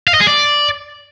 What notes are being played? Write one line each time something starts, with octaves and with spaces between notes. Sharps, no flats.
F5
D#5
G#4
D5